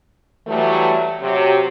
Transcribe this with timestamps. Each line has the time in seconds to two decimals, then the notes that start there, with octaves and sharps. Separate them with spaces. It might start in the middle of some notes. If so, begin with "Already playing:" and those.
0.47 E3 F#3 G3 A3
1.22 C3 F#3